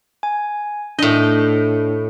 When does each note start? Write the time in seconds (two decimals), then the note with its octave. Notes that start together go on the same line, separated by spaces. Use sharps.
0.23 G#5
0.99 A2 D4 D#5